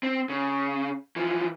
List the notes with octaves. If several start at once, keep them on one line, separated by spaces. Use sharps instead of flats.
C4
C#3
E3 F3